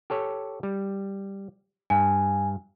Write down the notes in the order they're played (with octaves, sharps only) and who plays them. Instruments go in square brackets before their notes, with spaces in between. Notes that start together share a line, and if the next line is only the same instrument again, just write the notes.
[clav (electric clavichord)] G4 A4 C#5
G3
[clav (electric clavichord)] G2 [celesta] G#5